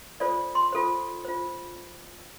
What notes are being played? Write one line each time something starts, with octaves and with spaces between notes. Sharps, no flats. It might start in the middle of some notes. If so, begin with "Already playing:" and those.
F4 A4 C5 D5
C6
F4 A4 C5
F4 C5